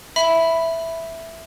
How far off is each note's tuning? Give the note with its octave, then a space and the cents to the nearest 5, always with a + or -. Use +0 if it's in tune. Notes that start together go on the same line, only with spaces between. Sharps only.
E5 +0 B5 +0